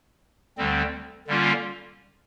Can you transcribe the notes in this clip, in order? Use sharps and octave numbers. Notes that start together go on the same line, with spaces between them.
D2 D3 G3 C4
D3 G3 A#3 C#4 F4